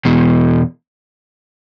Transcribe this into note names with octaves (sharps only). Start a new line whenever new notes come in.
E2 B2